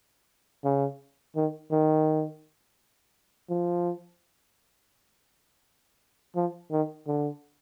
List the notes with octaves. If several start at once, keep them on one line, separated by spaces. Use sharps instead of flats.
C#3
D#3
D#3
F3
F3
D#3
D3